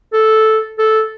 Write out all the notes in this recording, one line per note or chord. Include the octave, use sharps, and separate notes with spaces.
A4
A4